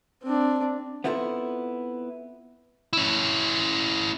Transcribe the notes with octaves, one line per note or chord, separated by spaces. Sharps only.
C4 D4
B3 C4 E4 F4 A4 B4
C#4 E4